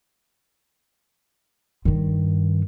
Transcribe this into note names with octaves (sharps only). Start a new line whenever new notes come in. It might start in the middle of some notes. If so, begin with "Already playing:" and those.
G2 D#3